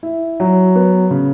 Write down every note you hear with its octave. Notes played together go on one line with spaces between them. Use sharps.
E4
F#3
B3
C#3